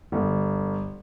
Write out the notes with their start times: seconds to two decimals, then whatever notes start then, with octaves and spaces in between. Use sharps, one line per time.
0.12 G1